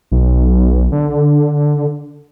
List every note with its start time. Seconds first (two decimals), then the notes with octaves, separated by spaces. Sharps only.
0.11 B1
0.92 D3